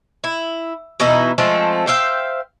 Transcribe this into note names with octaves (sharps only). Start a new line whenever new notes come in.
E4
B2 E3 D#4 E4
F3 G#3 A3 C4
C5 E5 F5 G5